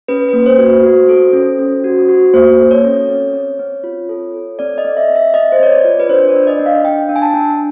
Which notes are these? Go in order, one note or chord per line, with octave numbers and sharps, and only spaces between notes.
C#4 B4
A#3 B4
C5
F#4
F#4
A4
C#4
C#4
F#4
F#4
A#3 C5
A4
C#5
C#4
C4
C4
C4
F4
A4
A4
C4 D5
D#5
C4
E5
C4
E5
C4 D#5
C5
C4 C#5
D5
F4
B4
D4 C5
D5
D4
D#5
D4
F5
D4 G5
D4
G#5
A5
D4